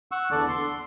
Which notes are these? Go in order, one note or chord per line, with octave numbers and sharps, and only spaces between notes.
F#5 C#6 E6
E2 D3 A4 D5
C6